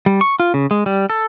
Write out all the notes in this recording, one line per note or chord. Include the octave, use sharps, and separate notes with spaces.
G3
C#6
F4
C#3
G#3
G3
A4